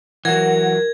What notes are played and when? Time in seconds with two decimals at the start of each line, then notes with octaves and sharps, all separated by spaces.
0.25 E3 F#3 A#4 F#5 G#6